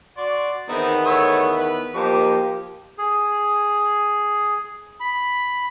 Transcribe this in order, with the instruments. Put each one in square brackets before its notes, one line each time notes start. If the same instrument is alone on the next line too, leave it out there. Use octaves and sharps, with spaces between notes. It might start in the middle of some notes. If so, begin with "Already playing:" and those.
[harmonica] F#4 D5 C6
[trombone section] E2 D#3 B3 [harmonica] C4 D#4 E4
[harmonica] A3 C#5 E6
B4
[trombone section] F3 A#3 G4 [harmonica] D#4 C5 D6
[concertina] G#4
B5